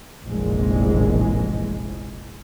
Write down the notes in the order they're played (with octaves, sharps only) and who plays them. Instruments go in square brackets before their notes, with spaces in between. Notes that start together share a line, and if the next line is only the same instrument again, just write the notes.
[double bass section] F1 A#1 E3 G#3